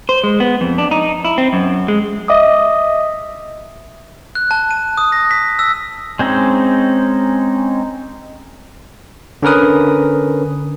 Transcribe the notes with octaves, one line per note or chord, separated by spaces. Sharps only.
C5
G#3
B3
F2
D4
D#4
E4
C4
F#2
G#3
D#5 E5 D6 D#6
F#6
A5
D#7
D#6
A#6
B6
E6
G#3 C4 C#4 D#4
D3 C#4 A#4 B4 D#6